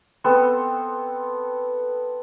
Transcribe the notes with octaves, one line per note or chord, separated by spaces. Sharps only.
B3 C4 A4 E6